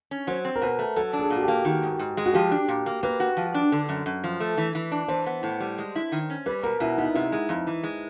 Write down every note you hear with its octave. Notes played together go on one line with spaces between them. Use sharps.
C#4
F#3 C5
C4
A#4
B2 B4
A3
F#3 A4
D4
G#4
A#2
F#4
A#3 G4
D#3 F#4
G#2
G#2
G#3
F#4
F3 G4
D4
A#2
A#3
A#3 B4
F#4
F3
D4
D3
F#2
F#2
F3
A3
E3
E3
D4
E3 C5
B3
A2
G3
G#3
E4
D#3
C#4
G3 B4
B2 A#4
B2 E4
B3 D#4
C3 E4
G#3
F2
E3
G#3